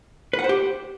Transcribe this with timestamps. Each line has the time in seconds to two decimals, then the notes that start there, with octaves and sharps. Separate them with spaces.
0.33 B4
0.39 F#5
0.44 C5
0.49 G4